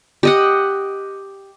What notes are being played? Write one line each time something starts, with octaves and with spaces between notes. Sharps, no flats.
G4 D#5 F#5